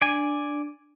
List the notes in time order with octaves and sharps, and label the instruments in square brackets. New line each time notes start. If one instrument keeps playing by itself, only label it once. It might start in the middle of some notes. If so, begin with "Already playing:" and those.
[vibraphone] D4 [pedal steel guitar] D5 G#5